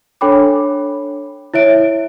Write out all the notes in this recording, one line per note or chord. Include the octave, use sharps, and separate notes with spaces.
D4 A4 C#5 G5 B5 D6
E4 C#5 E5 D7